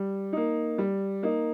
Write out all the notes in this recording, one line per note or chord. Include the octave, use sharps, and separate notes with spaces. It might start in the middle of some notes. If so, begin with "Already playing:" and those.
Already playing: G3
A#3 D#4
G3
A#3 D#4